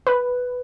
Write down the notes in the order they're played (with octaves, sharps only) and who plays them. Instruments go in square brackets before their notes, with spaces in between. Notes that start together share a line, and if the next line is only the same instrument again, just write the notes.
[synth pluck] B4